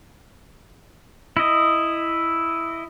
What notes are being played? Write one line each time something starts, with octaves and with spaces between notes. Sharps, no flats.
E4 D#5